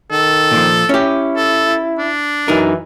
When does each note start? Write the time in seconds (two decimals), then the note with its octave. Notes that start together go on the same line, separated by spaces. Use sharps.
0.11 D#3 A4
0.51 A#2 F3
0.89 C#4 E4 G4
1.36 A4
1.98 D4
2.48 F#2 E3 D#4 A#4